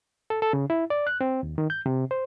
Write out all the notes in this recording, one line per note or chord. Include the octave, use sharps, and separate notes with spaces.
A4
A4
C#3
E4
D5
F#6
C4
D#2
D#3
G6
C3
C5